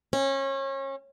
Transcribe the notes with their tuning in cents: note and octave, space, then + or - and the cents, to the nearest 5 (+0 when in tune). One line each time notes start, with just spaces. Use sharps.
C#4 -30